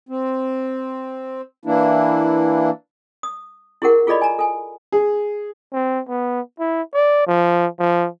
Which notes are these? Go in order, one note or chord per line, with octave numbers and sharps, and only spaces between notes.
C4
E3 A#3 D4 E4
D#6
E4 G4 G#4 A#4 F#5
F4 G#4 A4 D5 D#5 B5
G#5 A#5
A4 G#5
G#4
C4
B3
E4
D5
F3
F3